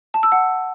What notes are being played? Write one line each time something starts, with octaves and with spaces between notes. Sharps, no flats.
A5
E6
F#5